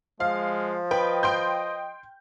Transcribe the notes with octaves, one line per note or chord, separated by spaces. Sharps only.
F3 G#3 F5
B4 D#5 G5
G5 C6 G6